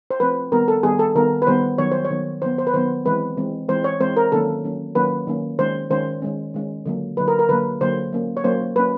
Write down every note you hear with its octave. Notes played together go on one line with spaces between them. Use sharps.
C5
F3 A3 C4 B4
D#3 G3 B3 A#4
A4
D#3 G3 B3 G#4
A4
D#3 G3 B3 A#4
B4
D#3 G3 B3 C5
D#3 F#3 B3 C#5
C5
C#5
D#3 F#3 B3
D#3 F#3 B3 C5
C5
B4
D#3 F#3 B3 C5
E3 G#3 C4 B4
E3 G#3 C4
E3 G#3 C4 C5
C#5
E3 G#3 C4 C5
A#4
D#3 F#3 A#3 C#4 A4
D#3 F#3 A#3 C#4
D#3 F#3 A#3 C#4 B4
D#3 F#3 A#3 C#4
D#3 G#3 C#4 C5
D#3 G#3 C#4 C5
D#3 G#3 C#4
D#3 G#3 C#4
D3 F#3 A#3
D3 F#3 A#3 B4
A#4
A#4
D3 F#3 A#3 B4
D3 F#3 A#3 C5
F#3 A#3 C#4
C#5
F#3 A#3 C#4 C5
F#3 A#3 C#4 B4